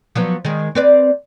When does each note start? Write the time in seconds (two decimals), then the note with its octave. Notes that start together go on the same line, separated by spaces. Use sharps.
0.15 F3 F#3 B3
0.45 D#3 G#3
0.75 C4 B4 D5